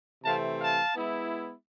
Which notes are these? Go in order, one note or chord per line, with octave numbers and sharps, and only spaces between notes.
C3 E3 A3 C4 F5 A5
F5 A5
G#3 B3 E4